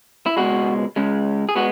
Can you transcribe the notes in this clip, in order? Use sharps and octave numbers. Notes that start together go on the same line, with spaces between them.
E4
C#2 B2 G#3 F#4
C#2 C#3 G#3
G#4
G#3 B3 F#4